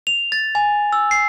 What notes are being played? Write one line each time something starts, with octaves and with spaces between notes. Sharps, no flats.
F7
A6
G#5
E6
C7